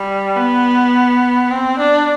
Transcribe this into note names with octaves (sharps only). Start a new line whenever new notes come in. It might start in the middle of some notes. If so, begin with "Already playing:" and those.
Already playing: G3
B3
C4
D4